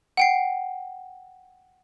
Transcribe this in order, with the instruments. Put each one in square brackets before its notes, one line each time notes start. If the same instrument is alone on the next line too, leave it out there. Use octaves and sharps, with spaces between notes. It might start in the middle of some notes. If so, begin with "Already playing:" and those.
[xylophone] F#5 G5 C7